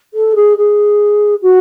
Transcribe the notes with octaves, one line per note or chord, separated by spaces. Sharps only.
A4
G#4
G#4
F#4